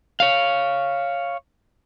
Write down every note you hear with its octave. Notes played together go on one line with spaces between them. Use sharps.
C#5 F5